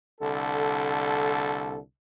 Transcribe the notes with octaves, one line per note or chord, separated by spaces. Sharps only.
C2 D3 A4